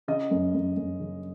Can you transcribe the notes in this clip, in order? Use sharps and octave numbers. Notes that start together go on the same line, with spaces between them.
C#3 D#5
F#2
F#2
F#2
C#3